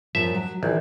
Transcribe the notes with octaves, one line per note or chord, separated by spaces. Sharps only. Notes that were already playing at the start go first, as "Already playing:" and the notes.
F#2 F3 E5
F#3
A#1 D#3 E3